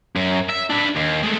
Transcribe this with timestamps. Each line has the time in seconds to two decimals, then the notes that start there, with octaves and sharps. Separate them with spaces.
0.16 F#2
0.49 E5
0.70 D4 B4
0.96 D#2
1.23 G#3 A3